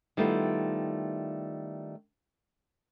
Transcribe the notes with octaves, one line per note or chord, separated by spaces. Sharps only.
D#3 G3 A3 B3 E4 F4